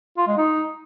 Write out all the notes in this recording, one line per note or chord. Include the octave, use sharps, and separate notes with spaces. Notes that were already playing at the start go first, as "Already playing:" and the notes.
F4
G#3
D#4